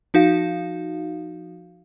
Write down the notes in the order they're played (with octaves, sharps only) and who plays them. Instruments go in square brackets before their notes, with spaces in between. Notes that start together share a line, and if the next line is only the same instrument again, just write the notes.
[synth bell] F3 D#4 F#4 F5